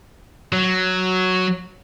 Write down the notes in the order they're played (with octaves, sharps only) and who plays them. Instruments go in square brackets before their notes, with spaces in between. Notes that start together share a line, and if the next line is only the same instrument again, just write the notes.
[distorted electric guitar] F#3